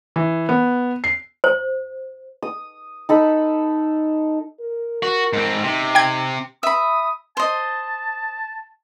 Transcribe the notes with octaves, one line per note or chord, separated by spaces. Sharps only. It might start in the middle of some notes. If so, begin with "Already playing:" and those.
E3
B3
C7
C5
D#6
D#4 A4 B5
A#4
F#4 A#4
G#2 C4
C3 D#4
G5 G#6
E5 B5 D#6
C5 D#5 A5